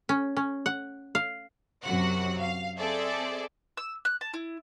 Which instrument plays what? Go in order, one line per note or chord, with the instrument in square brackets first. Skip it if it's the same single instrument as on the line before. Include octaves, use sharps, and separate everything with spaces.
[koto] C#4
C#4
F#5
F5
[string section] F#2 C3 F#3 F#4 F#5
F5
C4 G#4 A4 D5 E5
[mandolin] E6
F#6
A5
E4